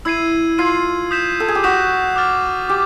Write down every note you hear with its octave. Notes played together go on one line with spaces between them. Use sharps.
E4 E6 G#6 C7 D#7
F4 E6 G#6 C7 D#7
D#6 G6 B6 E7
A4
G#4
G4
F#4 D#6 G6 B6 E7
D6 F6 A6
G4 D6